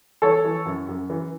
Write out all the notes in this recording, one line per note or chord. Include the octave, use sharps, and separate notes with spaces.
E3 A4 C#5
E3
F#2
F#2
E3